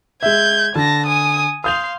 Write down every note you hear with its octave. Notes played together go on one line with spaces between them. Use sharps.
G#3 E5 G6 G#6
D3 A5 A#6
G#5 D#6
F5 C6 D#6 G6 F7